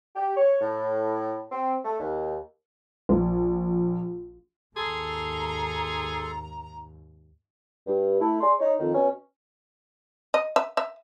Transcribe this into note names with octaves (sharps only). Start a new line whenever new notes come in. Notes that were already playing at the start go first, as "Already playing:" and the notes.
G4
C#5
A2
C4
A3
D#2
A#1
D#2 G#2 G#4 A4 A#5 C6
G2
A3 E4
G#4 D5 C6
D#4 C#5
F2 D#3
B2 C#4
D#5
E5
E5